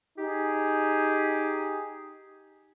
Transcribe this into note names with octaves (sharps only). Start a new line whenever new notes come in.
D#4 G4 G#4